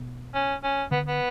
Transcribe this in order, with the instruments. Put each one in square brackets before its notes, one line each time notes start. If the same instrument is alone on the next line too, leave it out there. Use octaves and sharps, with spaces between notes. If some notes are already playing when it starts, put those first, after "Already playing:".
Already playing: [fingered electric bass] B2
[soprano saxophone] C#4
C#4
[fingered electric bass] D3 [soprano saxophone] B3
[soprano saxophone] B3